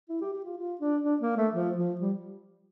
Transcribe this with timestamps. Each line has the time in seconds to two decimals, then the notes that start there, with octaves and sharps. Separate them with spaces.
0.09 E4
0.21 G4
0.33 G4
0.45 F4
0.57 F4
0.81 D4
1.04 D4
1.21 A#3
1.37 A3
1.53 F3
1.76 F3
2.01 G3